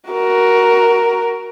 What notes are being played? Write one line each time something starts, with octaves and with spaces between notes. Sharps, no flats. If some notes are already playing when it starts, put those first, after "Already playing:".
F#4 A#4